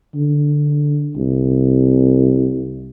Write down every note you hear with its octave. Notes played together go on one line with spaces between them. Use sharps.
D3
C2